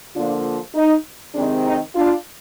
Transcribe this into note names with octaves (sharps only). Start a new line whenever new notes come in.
D3 F3 A#3 D4 F4
D#4
C3 D#3 G#3 C4 D4
D#4
D4 F4